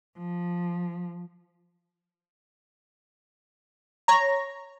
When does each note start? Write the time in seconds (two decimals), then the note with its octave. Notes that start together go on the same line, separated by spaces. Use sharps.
0.17 F3
4.08 C#5 A#5